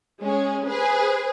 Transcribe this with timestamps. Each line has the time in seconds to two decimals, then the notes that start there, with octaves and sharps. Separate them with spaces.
0.21 G#3 C#4 G#4
0.66 G#4 B4 C5